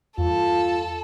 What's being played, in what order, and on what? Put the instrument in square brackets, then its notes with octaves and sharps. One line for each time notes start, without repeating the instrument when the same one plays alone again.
[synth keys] E2 G2 [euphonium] F4 [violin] A4